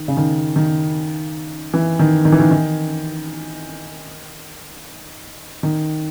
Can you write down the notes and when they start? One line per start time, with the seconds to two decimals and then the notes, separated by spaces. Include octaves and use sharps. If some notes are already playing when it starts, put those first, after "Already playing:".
Already playing: D#3
0.08 C#3
0.17 D#3
0.56 D#3
1.74 E3
1.99 D#3
2.25 D#3
2.32 E3
2.40 D#3
2.51 D#3
5.63 D#3